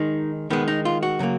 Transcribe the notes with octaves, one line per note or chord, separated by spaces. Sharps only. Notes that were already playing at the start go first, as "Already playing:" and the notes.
Already playing: D#3 G#3 D#4
D#3 G#3 B3
D#4
F4
F#4
C#3 F#3 A#3